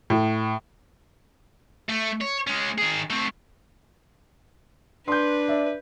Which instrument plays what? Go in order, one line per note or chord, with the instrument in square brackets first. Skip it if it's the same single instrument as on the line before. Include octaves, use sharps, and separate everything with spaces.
[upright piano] A2
[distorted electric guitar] A3
C#5
G#3 C#4
D#3 G#4
A3 C4
[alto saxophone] D4 [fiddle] B4 [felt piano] C6 G6
[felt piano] D5 E5